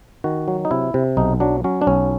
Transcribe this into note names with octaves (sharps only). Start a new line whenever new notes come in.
D#3 F#4
F#3
D#4
C3 E4
C3
B1 D#4
F#3 D4
F#3 C#4
D4
B1 C#4